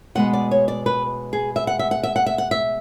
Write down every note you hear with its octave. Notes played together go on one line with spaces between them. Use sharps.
B2 G#3 B3 F#5
D5
C#5
D5
B4
G#4
E5
F#5
E5
F#5
E5
F#5
E5
F#5
E5